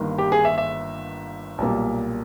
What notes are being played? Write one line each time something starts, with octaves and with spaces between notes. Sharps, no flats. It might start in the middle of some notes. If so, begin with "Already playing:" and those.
Already playing: G1 G2 D#3 A#3
G4
G#4
E5
E5
B1 A#2 G3 A#3